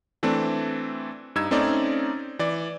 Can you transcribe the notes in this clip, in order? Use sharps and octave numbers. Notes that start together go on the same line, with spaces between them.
E3 A3 C4 D4
G2 D#4 E6 G#6
A3 C4 C#4 D#4 D5
E3 D5